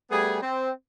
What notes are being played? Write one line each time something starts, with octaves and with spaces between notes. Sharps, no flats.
G3 A3 B3 G#4
C4